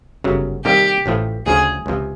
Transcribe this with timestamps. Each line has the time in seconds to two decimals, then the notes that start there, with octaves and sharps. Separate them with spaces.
0.24 G1 F#2 C#3 F#3
0.65 C3 D#3 G3 A#3 G4
1.06 A1 A2 F3 A3
1.46 D2 C#3 F3 G#4
1.86 C#2 C3 F3